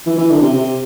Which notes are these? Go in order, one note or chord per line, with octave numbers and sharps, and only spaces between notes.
E3
E3
D3
C3
C3